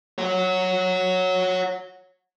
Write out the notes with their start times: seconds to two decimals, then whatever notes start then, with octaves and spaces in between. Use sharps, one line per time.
0.18 C#5 F#5